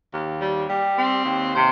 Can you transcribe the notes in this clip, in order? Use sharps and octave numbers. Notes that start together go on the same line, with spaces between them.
D#2
G3
G3
C4
D#2
C3 C5